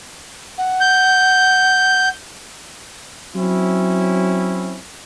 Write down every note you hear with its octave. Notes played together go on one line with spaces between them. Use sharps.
F#5
G6
F#3 C4 C#4 E4